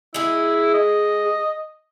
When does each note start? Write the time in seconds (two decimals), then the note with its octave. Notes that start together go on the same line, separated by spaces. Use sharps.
0.14 G#3 E4 G#4
0.74 D#5